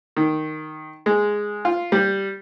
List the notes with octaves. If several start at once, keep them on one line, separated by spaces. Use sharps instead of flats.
D#3
G#3
F4
G3